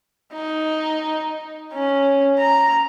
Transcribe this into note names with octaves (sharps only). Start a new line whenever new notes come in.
D#4
C#4
A#5